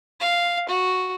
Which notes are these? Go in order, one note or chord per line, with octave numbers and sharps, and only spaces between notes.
F5
F#4